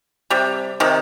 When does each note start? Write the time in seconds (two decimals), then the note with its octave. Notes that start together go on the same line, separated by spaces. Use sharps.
0.30 C3 G3
0.80 C3 D#3